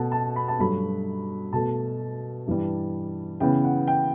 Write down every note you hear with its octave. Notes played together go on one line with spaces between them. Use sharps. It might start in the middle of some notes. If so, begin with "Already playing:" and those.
Already playing: B2 A3 F#5 A5
A5
B5
A5
G2 F#3 A3 B5
B2 A3 A5
G2 E3 G3
C#3 E3 B3 G5
F#5
G5